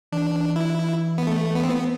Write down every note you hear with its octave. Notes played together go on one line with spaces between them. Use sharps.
E3 D4
E4
B3
A3
B3
C4
B3